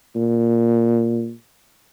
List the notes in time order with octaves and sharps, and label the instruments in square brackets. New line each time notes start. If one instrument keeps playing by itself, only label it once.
[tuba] A#2